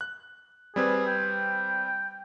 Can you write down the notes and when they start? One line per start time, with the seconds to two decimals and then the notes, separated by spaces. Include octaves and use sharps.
0.01 F#6
0.76 G3 C4 G#4 B4
1.07 G5